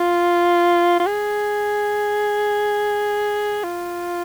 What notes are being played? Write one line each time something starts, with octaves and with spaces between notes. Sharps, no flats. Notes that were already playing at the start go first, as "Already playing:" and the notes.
Already playing: F4
F4
G#4
F4